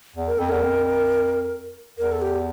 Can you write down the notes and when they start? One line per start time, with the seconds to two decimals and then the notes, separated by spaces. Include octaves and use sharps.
0.16 E2
0.27 A#4
0.38 F2 A4
0.49 E2 A#4
0.63 F2
1.98 E2 A#4
2.12 A4
2.22 G4